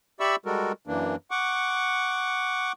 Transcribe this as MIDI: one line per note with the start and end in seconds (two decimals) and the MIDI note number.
0.20 0.36 67
0.20 0.36 74
0.20 0.36 76
0.20 0.36 83
0.20 0.36 85
0.20 0.36 88
0.46 0.72 55
0.46 0.72 56
0.46 0.72 66
0.46 0.72 69
0.46 0.72 70
0.87 1.16 42
0.87 1.16 52
0.87 1.16 58
0.87 1.16 62
1.31 2.72 78
1.31 2.72 85
1.31 2.72 86